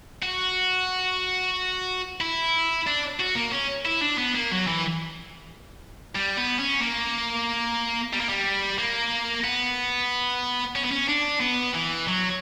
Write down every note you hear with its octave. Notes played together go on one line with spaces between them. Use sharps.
F#4
E4
D4
F#4
A#3
C#4
E4
D4
B3
A#3
F#3
E3
G3
B3
C#4
A#3
G3
A#3
G3
A#3
B3
C#4
B3
C#4
D4
B3
E3
F#3